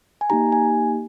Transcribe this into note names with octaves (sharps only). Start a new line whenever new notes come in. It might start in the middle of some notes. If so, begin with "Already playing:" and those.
G#5
A#3 D#4 G4 A#5
G#5